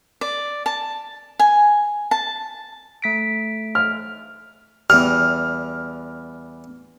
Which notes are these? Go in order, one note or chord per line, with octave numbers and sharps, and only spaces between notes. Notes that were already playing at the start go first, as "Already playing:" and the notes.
D5
A5
G#5
A5
A3 B6 D7
F6
E2 G3 F6